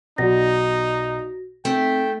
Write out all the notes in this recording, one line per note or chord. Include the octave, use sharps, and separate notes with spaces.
B1 D#4 F#4 D5 F#5 A#6
A3 C4 D#4 G5